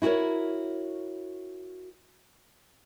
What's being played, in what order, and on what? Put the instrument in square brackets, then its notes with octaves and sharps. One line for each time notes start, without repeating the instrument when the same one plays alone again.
[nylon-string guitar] E4 F#4 G4 A#4 C#5